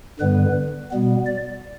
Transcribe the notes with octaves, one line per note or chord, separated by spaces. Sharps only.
G2 D3 G3 B3 B4
B2 G3 B3
D5